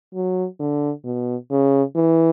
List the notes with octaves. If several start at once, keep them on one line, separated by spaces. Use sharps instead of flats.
F#3
D3
B2
C#3
E3